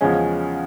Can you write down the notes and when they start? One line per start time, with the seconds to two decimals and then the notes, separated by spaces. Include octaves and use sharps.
0.01 E2 C#3 F3 G#3 C#4